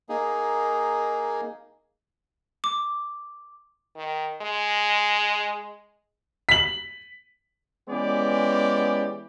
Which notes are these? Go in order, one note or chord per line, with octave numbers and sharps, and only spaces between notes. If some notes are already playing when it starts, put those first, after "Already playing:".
A#3 D#4 G#4
D6
D#3
G#3
B6 F#7
E3 G#3 B3 C#4 G4 D5